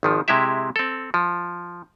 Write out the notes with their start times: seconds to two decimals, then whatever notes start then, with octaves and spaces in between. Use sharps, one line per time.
0.03 G#1 D#3 F3
0.28 C3 G#3 E4 G4 E5
0.76 C4 A4
1.14 F3